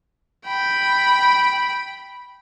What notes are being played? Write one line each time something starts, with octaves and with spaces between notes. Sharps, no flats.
G5 B5